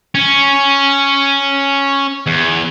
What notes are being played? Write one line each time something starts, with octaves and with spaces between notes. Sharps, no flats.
C#4
E2